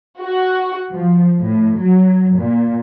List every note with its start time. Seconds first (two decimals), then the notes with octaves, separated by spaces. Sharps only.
0.20 F#4
0.94 F3
1.41 A2
1.80 F#3
2.39 A#2